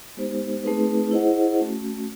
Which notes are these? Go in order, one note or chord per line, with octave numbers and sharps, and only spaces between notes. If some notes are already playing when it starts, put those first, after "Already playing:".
G#3 B3 D#4 G4 C5
A3 C4 D#4 G#4 B4
E4 G#4 C5 D#5 F#5
A3 C#4 F#4